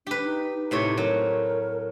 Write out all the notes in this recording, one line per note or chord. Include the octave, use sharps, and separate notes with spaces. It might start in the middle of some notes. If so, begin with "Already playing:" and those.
D4 G4 B4
D#4
A2 C3 D#4 C#5
F#3 A#4